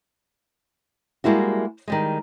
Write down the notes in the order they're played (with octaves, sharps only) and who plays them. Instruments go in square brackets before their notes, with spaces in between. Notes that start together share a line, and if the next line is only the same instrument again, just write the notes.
[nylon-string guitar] G3 G#3 A#3 E4 F#4
D#3 G3 G#3